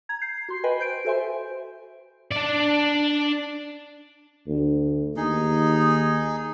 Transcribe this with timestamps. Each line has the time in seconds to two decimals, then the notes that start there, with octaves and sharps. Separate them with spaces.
0.09 A#5 G#6
0.22 G6 C7
0.49 F#4 C6
0.64 B4 D#5 G5 G#5 B5
0.79 C5 G6 D7
1.05 F#4 A4 C5 E5 G#5 C6
2.32 D4 D5
4.48 D2
5.17 D#2 D#4 G#4